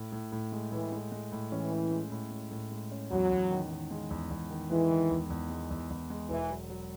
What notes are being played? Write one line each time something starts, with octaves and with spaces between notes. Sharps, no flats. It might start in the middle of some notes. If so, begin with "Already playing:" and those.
Already playing: A2
A2
A2
G#3
A2 E3
G#3
G#3
A2
E3 C#4
C#4
G#3
A2
G#3
A2
G#3
C#4
E2 F#3
E2
D#3
D#3
G#3
E2
E2
D#3
E3 G#3
D#3
E2
E2
G#3
E2
E2
G#3
E1 E3
F#3
F#3